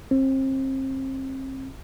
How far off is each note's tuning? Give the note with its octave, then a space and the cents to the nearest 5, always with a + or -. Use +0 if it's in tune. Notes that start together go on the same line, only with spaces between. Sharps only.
C4 +35